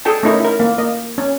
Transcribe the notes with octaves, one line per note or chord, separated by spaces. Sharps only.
G#4 A4 G5 A5
A3 C#4 D#4 E4 A#4
E4 A#4
A#3
A#3 D#5
C#4